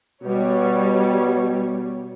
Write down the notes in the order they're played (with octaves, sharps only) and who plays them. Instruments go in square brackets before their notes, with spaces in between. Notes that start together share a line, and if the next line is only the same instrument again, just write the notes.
[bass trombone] B2 [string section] G3 C#5